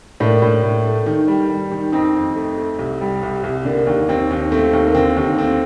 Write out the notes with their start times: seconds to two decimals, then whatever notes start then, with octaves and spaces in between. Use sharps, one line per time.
0.20 A2 A#3 D4
0.42 A2
0.63 A2
0.86 A3
1.06 D#3
1.28 G3
1.50 G3
1.71 D#3
1.92 F2 C4 D#4
2.14 F2
2.36 A3
2.57 A3
2.79 C2
3.01 G3
3.23 C2
3.43 C2
3.65 D3 A#3 D4
3.87 D#2
4.09 D#2 C4
4.31 D#2
4.52 A3 C4
4.73 D#2
4.86 A#3
4.95 D3 C4
5.16 D#2
5.38 A3 C4